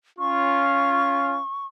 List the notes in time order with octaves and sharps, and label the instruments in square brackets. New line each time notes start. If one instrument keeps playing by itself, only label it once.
[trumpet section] C#4 F4 [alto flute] C#6